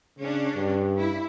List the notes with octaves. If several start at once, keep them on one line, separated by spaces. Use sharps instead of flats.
C#3 C#4 D4
G2
E4